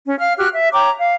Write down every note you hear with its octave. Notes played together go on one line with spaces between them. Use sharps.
C#4
F5 F6
F#4 G4 F6 F#6
E5
C#5 G5 A#5 D6
F5